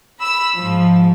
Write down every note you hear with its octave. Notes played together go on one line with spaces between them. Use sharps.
B5 E6
G#2 F3